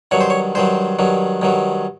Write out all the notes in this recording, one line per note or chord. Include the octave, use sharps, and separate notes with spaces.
G2 D#3 F#3 C#5
C5
C#5
G2 D#3 F#3 C5
G2 D#3 F#3
G2 D#3 F#3